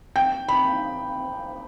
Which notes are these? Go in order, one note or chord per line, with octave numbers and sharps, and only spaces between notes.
G5
B5